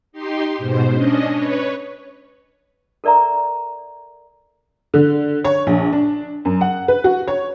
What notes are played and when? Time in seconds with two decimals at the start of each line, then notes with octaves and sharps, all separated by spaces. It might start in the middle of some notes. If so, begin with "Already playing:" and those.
0.12 D#4 G4 C6
0.58 G#2 B2 C5
0.92 C#4 D4 D#5
1.32 B4 C#5
3.04 A4 A#4 D5 E5 A#5
4.94 D3
5.44 C#5
5.67 A#1
5.93 D4
6.45 F#2
6.61 F#5
6.88 B4
7.04 F#4
7.28 C#5